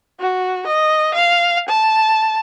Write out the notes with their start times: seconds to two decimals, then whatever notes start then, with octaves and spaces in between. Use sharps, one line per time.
0.20 F#4
0.67 D#5
1.14 F5
1.69 A5